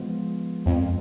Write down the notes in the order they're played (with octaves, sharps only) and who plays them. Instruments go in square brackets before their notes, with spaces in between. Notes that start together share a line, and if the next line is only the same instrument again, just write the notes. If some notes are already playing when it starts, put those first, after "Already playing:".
Already playing: [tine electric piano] F3 G#3 B3 F4
[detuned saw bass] F2